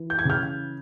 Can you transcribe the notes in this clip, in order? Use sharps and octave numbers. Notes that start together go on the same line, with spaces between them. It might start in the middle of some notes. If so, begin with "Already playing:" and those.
Already playing: E3
G6
G#6
C#3 F6 G6